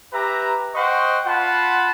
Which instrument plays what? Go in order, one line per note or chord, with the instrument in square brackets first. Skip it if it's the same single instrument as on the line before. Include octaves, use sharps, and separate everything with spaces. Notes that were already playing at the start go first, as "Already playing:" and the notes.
[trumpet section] G4 B4 E5 A#5
C5 D#5 F#5 G5 C#6
F4 F#5 A5 B5 C6